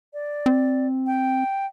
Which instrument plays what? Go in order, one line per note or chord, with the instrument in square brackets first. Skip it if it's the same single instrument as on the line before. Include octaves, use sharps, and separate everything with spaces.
[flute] D5
[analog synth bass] C4
[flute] G5